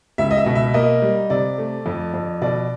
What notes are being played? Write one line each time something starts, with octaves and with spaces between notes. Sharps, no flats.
C#2 E5
D#5
E5
B2
E5
A#3 D#5
G3
C3 D5
A3
F2
F2
B2 D5